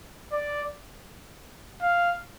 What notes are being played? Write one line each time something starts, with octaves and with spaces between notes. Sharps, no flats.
D5
F5